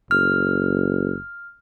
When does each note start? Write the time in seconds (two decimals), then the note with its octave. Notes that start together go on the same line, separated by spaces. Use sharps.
0.11 F#1 F6